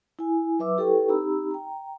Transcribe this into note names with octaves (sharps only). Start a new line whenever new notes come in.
E4 G#5
F#3 B4 E5 D6 E6
E4 G4 A4 B4 G5 C#6
C4 D#4 G4 A#5 B5 E6
G5 A#5